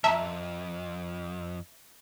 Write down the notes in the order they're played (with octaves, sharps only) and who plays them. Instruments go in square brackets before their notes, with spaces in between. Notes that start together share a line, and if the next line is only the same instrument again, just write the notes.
[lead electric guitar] B1 F2 [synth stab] E5 [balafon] A5 A#5